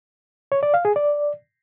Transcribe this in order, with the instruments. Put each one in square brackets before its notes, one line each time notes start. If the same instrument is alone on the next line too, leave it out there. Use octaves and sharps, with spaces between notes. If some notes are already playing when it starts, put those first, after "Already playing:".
[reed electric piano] C#5
D5
F5
G#4
D5